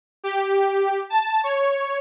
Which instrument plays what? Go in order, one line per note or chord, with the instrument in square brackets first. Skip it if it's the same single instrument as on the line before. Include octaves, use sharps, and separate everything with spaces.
[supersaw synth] G4
A5
C#5